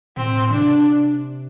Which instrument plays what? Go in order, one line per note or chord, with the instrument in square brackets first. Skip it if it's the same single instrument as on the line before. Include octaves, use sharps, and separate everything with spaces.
[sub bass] A2 [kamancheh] C4
[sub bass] C3 [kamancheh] D4